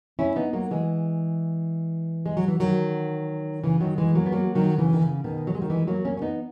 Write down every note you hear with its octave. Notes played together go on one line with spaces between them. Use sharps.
C#4 E4
B3 D#4
F#3 A#3
E3 G#3
G#3
F#3
E3
D#3 F#3
C#3 E3
D#3 F#3
E3 G#3
F#3 A#3
B3
F#3 A#3
D#3 F#3
C#3 E3
D#3
C#3
B2 D#3
F#3
G#3
D#3 F#3
E3 G#3
F#3 A#3
A#3 C#4
C#4
B3 D#4